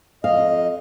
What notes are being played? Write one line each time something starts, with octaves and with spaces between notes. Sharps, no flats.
F2 D#5 F5